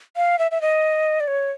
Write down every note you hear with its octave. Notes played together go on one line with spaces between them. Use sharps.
F5
E5
E5
D#5
D5
C#5